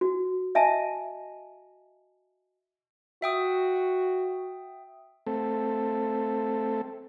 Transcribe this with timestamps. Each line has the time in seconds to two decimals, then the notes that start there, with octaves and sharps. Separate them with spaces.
0.01 F#4
0.55 D#5 E5 G#5 A5
3.22 F#4 E5 G5 D#6
5.27 A3 C4 A4